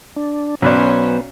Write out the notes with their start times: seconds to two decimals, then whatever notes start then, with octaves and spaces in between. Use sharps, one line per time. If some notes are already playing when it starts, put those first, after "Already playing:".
0.16 D4
0.62 B1 F#3 B3 C#4 F#4 B4 C5 D5